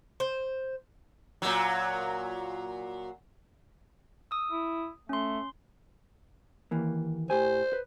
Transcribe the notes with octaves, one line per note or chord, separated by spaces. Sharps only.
C5
A#2 F#3
D#6 E6
E4
A3 C#4 C6
D#2 E3 A#3
A2 G4 C5 G#5
B4